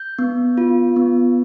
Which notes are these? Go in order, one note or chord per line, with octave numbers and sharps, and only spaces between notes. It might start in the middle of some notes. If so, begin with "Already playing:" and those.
Already playing: G6
B3
F4
B3